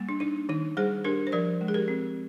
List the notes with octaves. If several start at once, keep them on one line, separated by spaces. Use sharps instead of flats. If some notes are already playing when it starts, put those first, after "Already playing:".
Already playing: G3 A#3
D4
D4 D#4
D#3 D#4
G3 G#4 C5
D4 G4 A#4
C5
F3 A#4 D5
G#3
G#4
G4 A#4
C4